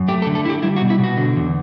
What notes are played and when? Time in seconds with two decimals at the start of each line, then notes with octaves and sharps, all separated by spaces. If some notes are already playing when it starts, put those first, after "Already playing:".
Already playing: F#2
0.08 A3 G4
0.22 A4
0.27 D3
0.35 A4
0.45 E4 G4
0.63 G3 E4
0.76 F#4
0.82 B2
0.90 E4
0.99 B2 F#4
1.17 D3
1.36 E2